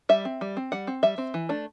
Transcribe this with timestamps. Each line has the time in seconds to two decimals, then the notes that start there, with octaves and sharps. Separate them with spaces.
0.09 G3 E5
0.25 C4
0.41 G3
0.57 C4
0.72 G3 F#5
0.87 C4
1.03 G3 E5
1.18 C4
1.34 E3
1.49 A3 D4